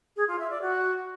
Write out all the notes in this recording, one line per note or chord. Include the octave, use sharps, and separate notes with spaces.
G#4
F4
E5
D5
F#4